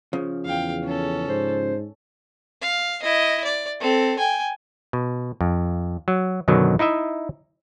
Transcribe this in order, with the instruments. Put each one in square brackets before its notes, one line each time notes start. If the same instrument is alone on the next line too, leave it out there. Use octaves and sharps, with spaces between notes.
[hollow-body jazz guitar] C#3 F3
[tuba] E2 [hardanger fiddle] F5 G5
[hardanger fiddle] C#4 A4
[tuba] G#2 [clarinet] C5
[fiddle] F5
E4 D#5
D5
C4 A4
G5 G#5
[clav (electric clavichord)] B2
F2
F#3
F#2 B2 D3 D#3 F#3
D#4 E4 D#5 E5